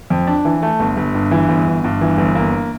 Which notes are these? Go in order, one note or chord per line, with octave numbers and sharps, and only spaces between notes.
F2
D4
E3
A3
G1
G1
G2
E3
G1
G1
G2
E3
G1
A#3